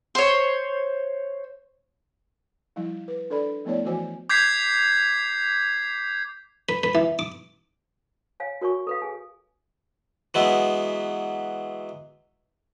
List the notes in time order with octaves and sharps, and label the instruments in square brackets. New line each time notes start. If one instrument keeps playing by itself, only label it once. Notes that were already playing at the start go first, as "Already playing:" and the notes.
[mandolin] C5 C#5
[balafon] F3 G3 E4
B4
D4 A4 D5 B5
F3 A3 B3 E4 C#5 D5
E3 F3 F#4 C5 G#5
[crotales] D6 G6 G#6 B6 C7
[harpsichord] B4
B4
E3
D6
[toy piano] C#5 F5 G#5
F#4 A#4 C#5 G#5 C#6
A4 B4 F5
G#4 G#5
[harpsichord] E3 F#3 G#3 B3 E4